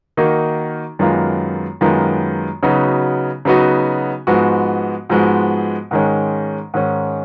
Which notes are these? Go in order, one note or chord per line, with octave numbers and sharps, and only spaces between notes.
D#3 A#3 D#4 F#4
F#2 D#3 G#3 B3 F4
F#2 D#3 G#3 B3 F4
C#3 F#3 B3 D#4 F#4
C#3 F#3 B3 D#4 F#4
G#2 F3 G#3 B3 F#4
G#2 F3 G#3 B3 F#4
G#2 D#3 G#3 C#4
G#2 D#3 G#3 C#4